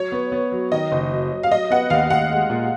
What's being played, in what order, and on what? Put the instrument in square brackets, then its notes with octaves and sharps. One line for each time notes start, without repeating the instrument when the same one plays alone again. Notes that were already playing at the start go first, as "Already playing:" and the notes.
Already playing: [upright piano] F#3 [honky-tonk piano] C#5
[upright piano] B3
B3
F#3
[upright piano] D#3 [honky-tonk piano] D#5
[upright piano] F#1
F#3
F#3
[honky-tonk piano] F5
[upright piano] F#3 [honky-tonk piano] D#5
[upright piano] B3 [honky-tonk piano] F#5
[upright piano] D#2 [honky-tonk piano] F5
[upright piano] D#2 [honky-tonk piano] F#5
[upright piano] G#3
A#2